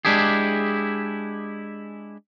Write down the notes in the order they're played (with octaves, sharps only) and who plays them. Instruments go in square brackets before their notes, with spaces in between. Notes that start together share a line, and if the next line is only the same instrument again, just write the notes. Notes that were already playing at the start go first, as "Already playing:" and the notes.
[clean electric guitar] G#3 D4 E4 G4 G#4